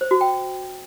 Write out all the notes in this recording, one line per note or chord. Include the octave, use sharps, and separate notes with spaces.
C5
F#4
G5